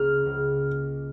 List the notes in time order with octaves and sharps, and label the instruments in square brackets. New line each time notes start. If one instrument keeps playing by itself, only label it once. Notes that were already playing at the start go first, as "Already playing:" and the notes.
Already playing: [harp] C#2 C#3 A#3 C#4 [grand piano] F6
[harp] C#2